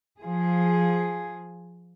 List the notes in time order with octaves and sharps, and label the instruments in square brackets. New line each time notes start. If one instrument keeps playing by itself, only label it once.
[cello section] F3 G#4